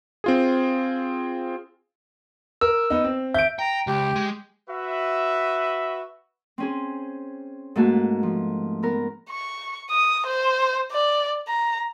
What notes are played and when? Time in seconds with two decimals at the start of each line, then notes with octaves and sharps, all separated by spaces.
0.24 C4 F4 G#4
2.61 A#4 E6
2.90 B3 D#4
3.04 C4
3.34 E5 G6 D7
3.59 G5 A#5
3.87 C#2 G4
4.16 G#3
4.69 F#4 B4 E5
6.58 C4 C#4 G#4
7.76 G#2 A3 A#3 F#4 A5
8.23 F3
8.83 B3 A#4
9.29 C#6
9.90 D#6
10.27 C5
10.92 D5
11.48 A#5